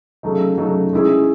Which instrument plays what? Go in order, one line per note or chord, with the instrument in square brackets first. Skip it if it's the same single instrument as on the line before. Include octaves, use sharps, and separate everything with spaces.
[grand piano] C#3 F#3 A3 D#4
C#3 F#3 A3 D#4
G#3 C#4 E4 G#4